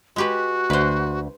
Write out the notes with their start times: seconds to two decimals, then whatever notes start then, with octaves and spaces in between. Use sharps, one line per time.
0.16 G#3 F#4 G4 B4
0.70 D2 B4 C5